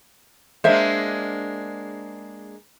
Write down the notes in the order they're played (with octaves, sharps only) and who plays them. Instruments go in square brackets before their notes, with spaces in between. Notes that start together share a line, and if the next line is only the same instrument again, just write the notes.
[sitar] G#3 A#3 D4 [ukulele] C5 E5